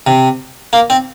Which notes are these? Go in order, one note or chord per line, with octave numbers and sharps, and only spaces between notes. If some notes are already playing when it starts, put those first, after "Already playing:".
C3
A#3
C4